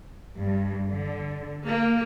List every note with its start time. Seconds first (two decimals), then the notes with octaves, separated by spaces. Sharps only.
0.39 G2
0.91 D3
1.65 A#3